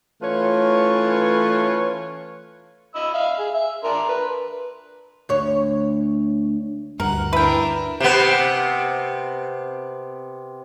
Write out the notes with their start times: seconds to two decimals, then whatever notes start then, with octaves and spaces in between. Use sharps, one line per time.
0.22 E3 A3 C#4 F4 B4 C#5
2.95 D#5 B5 E6
3.14 E5 F5
3.39 G#4
3.54 E5
3.84 D4 A#4 C6
4.09 B4
5.29 D2 C#5
7.00 D2 G2 A#4 F#5
7.33 D4 E4 A#4 B4 G5
8.00 C3 B3